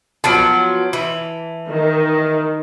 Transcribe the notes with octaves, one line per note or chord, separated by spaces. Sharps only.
F3 F#3 B3 A5 D7
E3
D#3